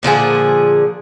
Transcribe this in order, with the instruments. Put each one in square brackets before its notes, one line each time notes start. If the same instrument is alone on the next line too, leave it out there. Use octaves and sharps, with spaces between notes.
[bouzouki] A#2 D3 F3 G#4